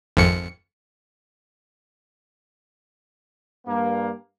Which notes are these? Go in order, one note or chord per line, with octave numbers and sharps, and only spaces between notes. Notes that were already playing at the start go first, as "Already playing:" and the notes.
G#1 F2 C#7
G2 A#3